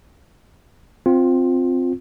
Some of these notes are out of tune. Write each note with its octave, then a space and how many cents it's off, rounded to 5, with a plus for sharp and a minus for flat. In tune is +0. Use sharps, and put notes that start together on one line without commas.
C4 +0 F4 +15